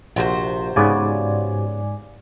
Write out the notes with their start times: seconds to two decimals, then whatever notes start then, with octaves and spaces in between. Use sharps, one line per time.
0.16 A#1 C3 F#4 C5
0.76 G#2 C#3 B3 D5 G#5